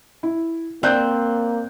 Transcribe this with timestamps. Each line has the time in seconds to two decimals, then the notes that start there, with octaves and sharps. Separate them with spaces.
0.23 E4
0.83 A#3 C4 D5 F#6 G6